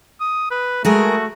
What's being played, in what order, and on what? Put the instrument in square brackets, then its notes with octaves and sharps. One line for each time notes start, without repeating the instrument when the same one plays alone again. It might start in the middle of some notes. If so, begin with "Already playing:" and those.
[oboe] D#6
B4
[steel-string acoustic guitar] G#3 G#4 A#4 [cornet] A3 [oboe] F#4